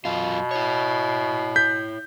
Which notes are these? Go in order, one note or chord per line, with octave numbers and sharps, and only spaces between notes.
F#2 B2 F4
E4 C#5
G6 B6